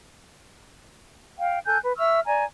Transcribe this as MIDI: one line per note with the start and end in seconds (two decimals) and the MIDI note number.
1.37 1.58 77
1.37 1.58 79
1.65 1.78 69
1.65 1.78 80
1.65 1.78 90
1.65 1.78 91
1.81 1.93 71
1.97 2.19 76
1.97 2.19 85
1.97 2.19 88
1.97 2.19 89
2.26 2.44 74
2.26 2.44 80
2.26 2.44 82